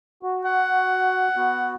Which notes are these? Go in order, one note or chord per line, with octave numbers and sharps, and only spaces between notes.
F#4
F#5
B3 F#4